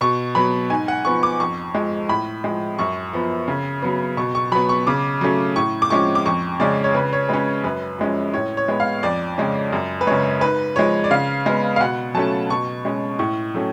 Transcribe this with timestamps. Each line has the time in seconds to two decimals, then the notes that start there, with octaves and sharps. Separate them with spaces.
0.01 B2 C#6
0.35 F#3 B3 B5
0.70 G#2 G#5
0.88 F#5
1.05 F3 B3 C#6
1.23 D6
1.40 F2 C#6
1.75 F3 G#3
2.09 A2 B5
2.44 F3 G#3
2.79 F#2 C#6
3.13 F3 B3
3.48 C#3
3.82 F#3 B3
4.17 B2 C#6
4.35 C#6
4.52 F#3 B3 B5
4.69 C#6
4.87 C#3 D6
5.21 F#3 A3 C#4
5.56 A2 C#6
5.82 D6
5.90 F3 G#3 C#4 C#6
6.15 D6
6.25 F2 C#6
6.60 C#3 G#3 C#4 D5
6.84 C#5
6.94 C#3 B4
7.13 C#5
7.29 G#3 C#4 B4
7.64 F#2 B4
7.99 F3 G#3 C#4
8.34 A2 C#5
8.57 C#5
8.68 G#3 B3
8.80 F5
9.03 F2 D5
9.38 C#3 G#3 C#4
9.73 F#2
10.01 B4
10.07 C#3 G#3 C#5
10.41 G#2 B4
10.76 F3 G#3 C#5
11.04 D5
11.11 C#3 F5
11.46 G#3 B3
11.76 F5
11.80 B2 F#5
12.14 F#3 A3 C#4 A5
12.49 B2 C#6
12.85 G#3 C#4
13.19 A2 C#6
13.54 F#3 A3 C#4